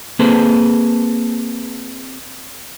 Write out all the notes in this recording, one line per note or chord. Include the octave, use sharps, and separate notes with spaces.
A#3 C4 G#4 A4 B4 C5